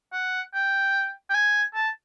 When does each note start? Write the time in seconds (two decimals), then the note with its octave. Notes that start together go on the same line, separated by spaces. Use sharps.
0.13 F#5
0.54 G5
1.30 G5
1.34 G#5
1.74 A5